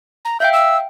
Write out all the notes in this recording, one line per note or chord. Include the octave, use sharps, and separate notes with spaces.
A#5
E5 F5 G5 G6
E6